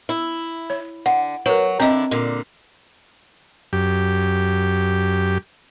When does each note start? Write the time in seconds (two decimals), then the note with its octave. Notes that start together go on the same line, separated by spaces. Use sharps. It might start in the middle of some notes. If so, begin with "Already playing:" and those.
0.09 E4
0.70 C#5
1.06 D3 F#5
1.46 F#3 A#4 B4
1.80 D3 C4 D4 E4 D#5 A#5
2.11 A#2 D3
3.73 F#2 G4